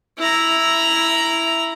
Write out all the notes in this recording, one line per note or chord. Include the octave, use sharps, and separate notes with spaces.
E4 A#5